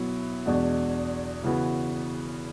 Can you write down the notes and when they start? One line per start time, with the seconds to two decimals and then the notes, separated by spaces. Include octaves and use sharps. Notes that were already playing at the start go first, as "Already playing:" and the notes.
Already playing: B2 F#3 B3 E4
0.46 E2 B2 G#3 D4 F#4
1.43 C#3 E3 B3 F#4